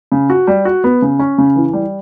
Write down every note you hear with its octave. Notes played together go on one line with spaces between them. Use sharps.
C#3
F#4
G3
F#4
B3
C#3
C#4
C#3
E3
G3